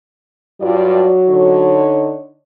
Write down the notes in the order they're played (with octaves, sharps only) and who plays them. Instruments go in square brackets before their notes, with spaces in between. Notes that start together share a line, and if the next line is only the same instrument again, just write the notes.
[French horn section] G2 F4 D5 [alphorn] F#3
[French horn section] D3 D#4 C#5